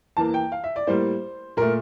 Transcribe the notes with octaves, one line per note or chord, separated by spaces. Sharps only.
E2 E3 A#3 A5
G5
F5
E5
D5
A2 G3 A#3 C5
A#2 A3 A#4